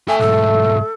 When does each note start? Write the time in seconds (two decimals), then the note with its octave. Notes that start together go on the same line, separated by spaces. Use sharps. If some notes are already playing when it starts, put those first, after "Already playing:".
0.08 A3 A4 G5 G#5
0.20 B1 G#2 A4